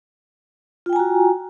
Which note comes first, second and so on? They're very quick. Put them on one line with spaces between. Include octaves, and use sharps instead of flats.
F4 G5 G#5 A#5 F#4